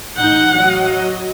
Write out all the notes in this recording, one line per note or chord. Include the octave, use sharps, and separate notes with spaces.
A1 D#4 F#5 G6
F#3 D#5